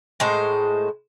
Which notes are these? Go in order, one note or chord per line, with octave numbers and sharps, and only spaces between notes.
A2 G#3 C5